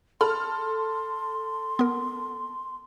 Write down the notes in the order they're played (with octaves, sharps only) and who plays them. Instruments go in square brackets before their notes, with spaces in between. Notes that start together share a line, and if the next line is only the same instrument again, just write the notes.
[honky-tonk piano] A4 F6 [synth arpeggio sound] B5 [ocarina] C6
[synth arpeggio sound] B3 A#4